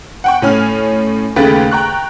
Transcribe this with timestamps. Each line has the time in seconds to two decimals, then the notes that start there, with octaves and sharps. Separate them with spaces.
0.24 F#5 G5 C#6
0.42 A2 C#4 G#5 F6
1.36 D#2 C#3 A3 B4 G5 A6
1.71 G5 A#5 C#6 F#6